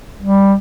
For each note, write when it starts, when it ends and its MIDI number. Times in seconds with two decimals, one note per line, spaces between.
0.21 0.56 55